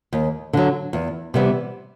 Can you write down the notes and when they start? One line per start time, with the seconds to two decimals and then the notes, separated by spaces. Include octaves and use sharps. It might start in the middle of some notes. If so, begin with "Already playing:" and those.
0.13 D#2
0.53 D3 F#3
0.93 E2
1.34 C3 E3 G3 B3